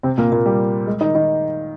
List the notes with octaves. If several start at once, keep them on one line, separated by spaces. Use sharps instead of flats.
C3 C4
A#2 A#3
A#2 A#3
G3
G#3
D#3 D#4
D#3 D#4